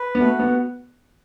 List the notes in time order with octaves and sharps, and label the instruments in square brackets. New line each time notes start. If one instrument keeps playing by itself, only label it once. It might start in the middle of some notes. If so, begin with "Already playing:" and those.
Already playing: [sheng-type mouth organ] B4
[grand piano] B3
[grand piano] A3 [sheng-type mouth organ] F#4
[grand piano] B3